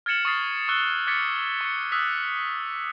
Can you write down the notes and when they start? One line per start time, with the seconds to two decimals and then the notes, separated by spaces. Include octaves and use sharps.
0.06 F6 G#6 A6 C#7 E7 F#7
0.25 C#6 D#6 A6 C7
0.68 C#6 E6 F#6 G7
1.07 D6 F6 G#6 A6 B6 C#7
1.61 C#6 C#7
1.92 D#6 E6 F#6 B6